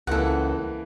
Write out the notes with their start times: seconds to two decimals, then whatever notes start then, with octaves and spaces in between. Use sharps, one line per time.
0.07 C#2 E3 A#3 A4 F#5